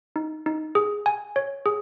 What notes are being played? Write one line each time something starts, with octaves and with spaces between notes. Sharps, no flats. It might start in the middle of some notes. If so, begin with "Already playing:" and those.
D#4
D#4
G#4
G#5
C#5
G#4